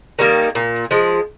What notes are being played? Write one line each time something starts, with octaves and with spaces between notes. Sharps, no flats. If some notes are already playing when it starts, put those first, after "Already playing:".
D#3 G3 A#3
A#2
F3 G#3